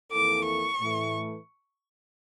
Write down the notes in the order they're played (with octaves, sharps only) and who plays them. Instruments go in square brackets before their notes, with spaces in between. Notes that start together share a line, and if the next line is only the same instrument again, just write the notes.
[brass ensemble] F2 E3 A#3 E4 A4 [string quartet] D6
[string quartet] C#6
[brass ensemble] A2 E3 A3 E4